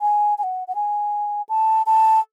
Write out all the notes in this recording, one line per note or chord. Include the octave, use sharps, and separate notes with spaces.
G#5
G#5
F#5
F#5
G#5
A5
A5